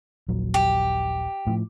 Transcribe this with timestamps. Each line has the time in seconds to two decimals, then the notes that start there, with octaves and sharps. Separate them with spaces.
0.29 D#1 A#1 F#3
0.54 G4
1.47 A2 F3